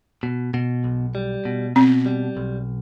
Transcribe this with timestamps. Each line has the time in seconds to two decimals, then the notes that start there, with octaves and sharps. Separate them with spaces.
0.23 B2
0.54 B2
0.84 B1
1.15 G3
1.45 B2
1.76 B2 C4
2.06 G3
2.37 B1